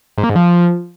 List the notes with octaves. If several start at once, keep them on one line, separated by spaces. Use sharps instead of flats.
G#2
A#3
G#2
F3